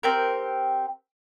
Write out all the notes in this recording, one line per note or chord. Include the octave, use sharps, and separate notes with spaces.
C4 G4 A#4